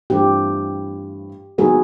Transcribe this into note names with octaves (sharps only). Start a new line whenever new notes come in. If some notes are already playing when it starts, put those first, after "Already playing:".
G2 E3 A3 C4 F4 G4
D#3 F#3 B3 G#4